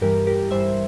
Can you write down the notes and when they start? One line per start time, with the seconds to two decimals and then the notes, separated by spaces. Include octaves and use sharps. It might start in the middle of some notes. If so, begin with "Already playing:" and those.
0.01 G2 E3 G3 G4 A#4
0.27 G4 A#4
0.51 G2 E3 G3 C5 E5